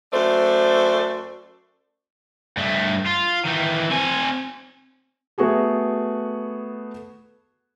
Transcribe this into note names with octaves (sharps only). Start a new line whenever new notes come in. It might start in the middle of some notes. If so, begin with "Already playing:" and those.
F#2 A3 C5 D5
G2 A3
F4
D#3 E3
C4 G#5
A3 B3 F#4 G#4 A4